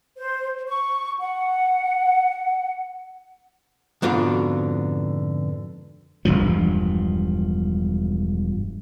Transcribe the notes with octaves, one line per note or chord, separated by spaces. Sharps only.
C5
C#6
F#5
F2 G#2 B2 D3 F4
E1 A#1 G2 F3